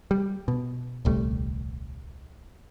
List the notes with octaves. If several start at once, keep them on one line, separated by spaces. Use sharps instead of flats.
G3
B2
D#1 C2 G3 A3